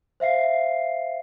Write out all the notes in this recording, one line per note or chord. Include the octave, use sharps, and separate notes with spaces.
C5 E5 F5 C7